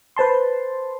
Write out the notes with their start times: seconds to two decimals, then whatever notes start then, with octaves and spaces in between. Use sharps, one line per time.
0.17 B4 C5 A5 C6